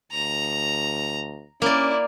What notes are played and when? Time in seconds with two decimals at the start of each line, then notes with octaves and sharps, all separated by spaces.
0.12 D2 A#5
1.62 A#3 C#4 E4 D5